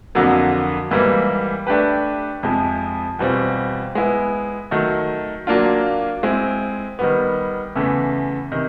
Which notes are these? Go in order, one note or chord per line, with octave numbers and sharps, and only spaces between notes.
F2 D3 F#3 A#3
G#2 E3 G3 A#3
A3 D4 G4 B4
F2 C3 F3 G#3
E2 B2 G3 C4 F4
G#3 B3 E4
D#3 F#3 A3
F#3 A#3 D4 F4
G#3 C4 E4
D#3 G3 B3
E2 C#3 E3 A3
C3 D#3